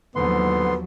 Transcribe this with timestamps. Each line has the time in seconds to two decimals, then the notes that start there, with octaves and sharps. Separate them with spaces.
0.15 D#2 G#2 D3 F3 F#3 B3 C6